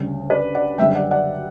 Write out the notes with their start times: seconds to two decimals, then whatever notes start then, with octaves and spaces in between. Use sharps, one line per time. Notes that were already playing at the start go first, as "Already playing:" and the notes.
Already playing: D2 C#3 G3
0.30 B4 D5
0.55 D5 F#5
0.78 F#1 F#2 D3 G3 E5 G5
0.95 D5 F#5
1.11 D5 F#5